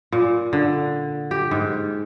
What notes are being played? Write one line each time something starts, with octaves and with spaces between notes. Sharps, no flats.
A#2
D3
G4
G#2